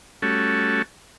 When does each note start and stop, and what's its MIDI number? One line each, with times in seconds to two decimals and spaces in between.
0.22 0.82 55
0.22 0.82 57
0.22 0.82 61
0.22 0.82 66
0.22 0.82 69